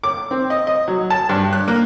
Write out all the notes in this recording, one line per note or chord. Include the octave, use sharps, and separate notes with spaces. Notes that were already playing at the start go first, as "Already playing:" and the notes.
D6
C4
D#5
D#5
F#3
A5
G2
F#6
A#3